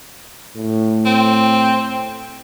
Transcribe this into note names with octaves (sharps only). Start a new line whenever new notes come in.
A2
C4